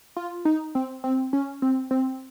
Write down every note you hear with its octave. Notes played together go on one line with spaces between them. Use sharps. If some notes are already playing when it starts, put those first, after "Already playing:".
F4
D#4
C4
C4
C#4
C4
C4